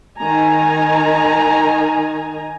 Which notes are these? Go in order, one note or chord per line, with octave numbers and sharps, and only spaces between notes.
D#3 D#4 G#5 A#5